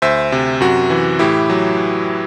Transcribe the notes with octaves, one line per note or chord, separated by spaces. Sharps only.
D2 C5 E5
C3
F#2 F#4
E3
A2 E4 G4
F#3